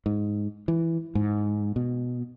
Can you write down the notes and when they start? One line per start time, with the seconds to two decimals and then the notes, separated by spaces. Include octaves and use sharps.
0.06 G#2
0.68 E3
1.15 G#2
1.76 B2